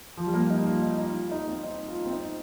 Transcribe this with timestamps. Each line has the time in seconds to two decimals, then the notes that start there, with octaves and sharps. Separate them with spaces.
0.17 F3
0.27 G3
0.34 A#3
0.50 D#4
0.66 F4
0.82 D#4
0.98 D#4
1.15 F4
1.31 D#4
1.47 C4
1.63 D#4
1.88 F4
2.05 C4
2.13 D#4